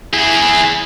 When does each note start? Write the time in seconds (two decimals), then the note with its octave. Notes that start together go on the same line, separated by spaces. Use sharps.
0.13 E4 G#4